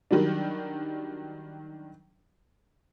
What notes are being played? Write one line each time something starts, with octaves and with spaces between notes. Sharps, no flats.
D#3 F#3 G3 D4